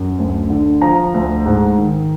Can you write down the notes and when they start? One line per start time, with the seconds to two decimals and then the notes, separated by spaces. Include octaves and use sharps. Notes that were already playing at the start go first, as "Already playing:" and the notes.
Already playing: F#2
0.19 D2
0.50 D3
0.81 F3 A#5
1.14 D2
1.46 G#2
1.78 D#3